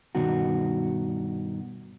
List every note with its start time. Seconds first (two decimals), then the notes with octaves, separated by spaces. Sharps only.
0.15 G2 B2 D#3 F#4